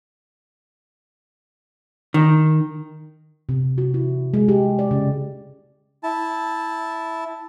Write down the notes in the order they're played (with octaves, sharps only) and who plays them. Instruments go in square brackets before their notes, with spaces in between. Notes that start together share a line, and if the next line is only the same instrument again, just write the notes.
[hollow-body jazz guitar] D#3
[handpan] C3
F#4
E4
G#3
G4
D5
C#3
[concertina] E4 A5